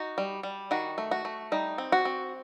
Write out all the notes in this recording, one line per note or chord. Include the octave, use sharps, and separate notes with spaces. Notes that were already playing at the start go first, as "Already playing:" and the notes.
Already playing: D#4 F#4
G3
G3
D#3 F#4
A3
F#4
A3
G3 D#4
C4
F#4
C4